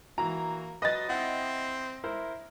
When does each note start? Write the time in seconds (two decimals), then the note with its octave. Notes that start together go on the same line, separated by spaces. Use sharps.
0.18 E3 A#3 F#4 A#5
0.82 F#3 B4 D#5 A6
1.09 C4 E4 F#5 G5
2.04 E4 A#4 C5